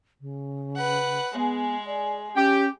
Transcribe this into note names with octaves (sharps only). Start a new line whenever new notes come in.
C#3
B4 F#5
G#3 B3 G#4
D5
C#4 G4